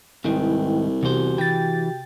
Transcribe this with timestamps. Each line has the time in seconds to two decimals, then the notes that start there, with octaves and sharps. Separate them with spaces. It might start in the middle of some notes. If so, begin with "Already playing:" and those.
0.24 C2 G#2 D#3 E4 B4 G5
1.03 E2 C3 F#4 G4 C5
1.38 E3 G5 A6